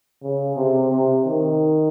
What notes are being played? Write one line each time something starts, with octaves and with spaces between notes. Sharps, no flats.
C#3
C3
C3
D#3